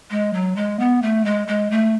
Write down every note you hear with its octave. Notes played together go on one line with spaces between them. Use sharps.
G#3
F#3
G#3
B3
A3
G#3
G#3
A3